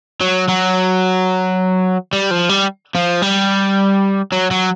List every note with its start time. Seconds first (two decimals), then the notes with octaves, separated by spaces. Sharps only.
0.21 F#3
0.48 F#3
2.13 G3
2.31 F3
2.50 G3
2.95 F3
3.22 G3
4.32 F#3
4.51 F#3